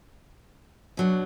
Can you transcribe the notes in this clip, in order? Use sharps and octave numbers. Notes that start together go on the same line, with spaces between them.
B2 F#3 D4